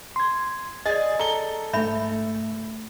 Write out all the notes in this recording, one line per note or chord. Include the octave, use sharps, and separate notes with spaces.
C6 G#6
G#4 D5 D#5 A6
A4 A#5 G7
G#2 A3 D4 E5 B5